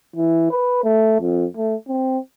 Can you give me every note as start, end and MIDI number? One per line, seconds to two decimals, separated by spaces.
0.16 0.48 52
0.50 0.82 71
0.84 1.18 57
1.20 1.45 41
1.56 1.75 57
1.88 2.18 60